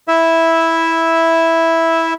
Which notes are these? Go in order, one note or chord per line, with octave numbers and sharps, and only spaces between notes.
E4 E5